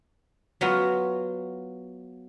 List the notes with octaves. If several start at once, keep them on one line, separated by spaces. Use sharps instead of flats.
F#3 B3 F4 F#4